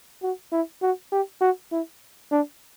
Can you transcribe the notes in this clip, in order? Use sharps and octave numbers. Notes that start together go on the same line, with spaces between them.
F#4
E4
F#4
G4
F#4
E4
D4